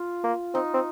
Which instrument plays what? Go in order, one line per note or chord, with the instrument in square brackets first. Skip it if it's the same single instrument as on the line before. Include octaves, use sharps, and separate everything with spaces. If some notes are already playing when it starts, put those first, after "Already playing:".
Already playing: [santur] F4
[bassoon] A#3
[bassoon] C4 [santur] D#4
[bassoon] C4